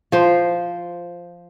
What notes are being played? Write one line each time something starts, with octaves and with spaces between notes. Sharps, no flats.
F3 C5